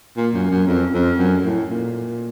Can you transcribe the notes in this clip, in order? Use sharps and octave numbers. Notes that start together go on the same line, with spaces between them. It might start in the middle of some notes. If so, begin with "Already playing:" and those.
A#2
F#2
F#2
F2
F2
F#2
A2
A#2